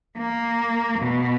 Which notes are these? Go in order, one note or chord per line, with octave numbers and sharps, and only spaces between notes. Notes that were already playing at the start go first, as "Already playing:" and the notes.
A#3
B2